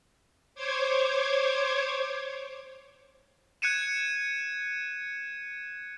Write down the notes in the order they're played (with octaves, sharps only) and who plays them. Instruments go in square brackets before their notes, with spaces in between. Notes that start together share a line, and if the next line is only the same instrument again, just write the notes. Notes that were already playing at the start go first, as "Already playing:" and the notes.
[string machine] C5 C#5 D6 G#6
[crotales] F#6 G#6 C#7 D#7 E7